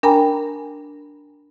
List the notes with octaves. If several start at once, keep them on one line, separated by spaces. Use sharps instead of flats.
D4 A#4 G5 G#5 A#5 B5